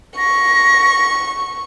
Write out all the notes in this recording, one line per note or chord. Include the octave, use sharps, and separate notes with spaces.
C#6 A#6